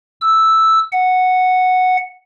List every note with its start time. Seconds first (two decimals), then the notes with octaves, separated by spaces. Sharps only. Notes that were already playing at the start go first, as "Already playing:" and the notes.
0.21 E6
0.92 F#5